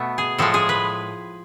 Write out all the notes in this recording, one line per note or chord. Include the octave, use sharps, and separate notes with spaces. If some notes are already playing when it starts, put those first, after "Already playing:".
Already playing: B2 A3 B3
G#4
A2 F3 G#3 A4
G#4
B4